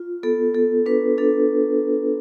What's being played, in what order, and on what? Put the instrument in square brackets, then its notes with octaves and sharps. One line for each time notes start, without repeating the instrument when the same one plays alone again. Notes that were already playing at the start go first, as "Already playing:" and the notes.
Already playing: [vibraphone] F4
B3 A4
B3 A4
D4 B4
D4 A4